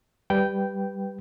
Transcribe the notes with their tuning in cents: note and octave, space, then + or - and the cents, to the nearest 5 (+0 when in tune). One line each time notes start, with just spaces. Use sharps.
G3 +0 B4 +0 G5 -10